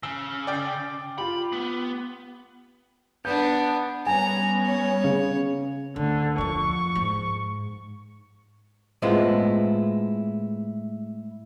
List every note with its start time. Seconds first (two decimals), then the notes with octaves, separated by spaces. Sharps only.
0.03 C#3 E6
0.47 D5 G5
1.18 F4 G4 B5
1.53 B3
3.25 B3 D4 G6
4.07 G3 B3 C#4 G#5 A#5
4.66 C#5
5.04 C#3
5.96 D2 D3
6.38 F2 F3 C#6
6.95 G#2
9.02 A2 G#3 B3 C4 E4 F4